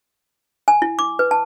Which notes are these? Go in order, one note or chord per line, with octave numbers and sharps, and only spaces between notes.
G#5
E4
D6
B4
A5